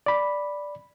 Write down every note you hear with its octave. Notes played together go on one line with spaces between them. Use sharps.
D5 B5